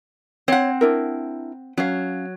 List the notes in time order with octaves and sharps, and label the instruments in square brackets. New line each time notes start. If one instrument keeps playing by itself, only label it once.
[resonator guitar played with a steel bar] C4 F#5 [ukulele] C#5
[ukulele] D4 E4 A#4
[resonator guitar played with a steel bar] F#3 [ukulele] C#4 F5